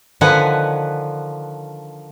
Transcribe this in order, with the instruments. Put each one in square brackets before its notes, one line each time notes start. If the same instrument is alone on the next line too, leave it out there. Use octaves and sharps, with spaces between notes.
[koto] D3 D#3 F3 B4 F#5 G#5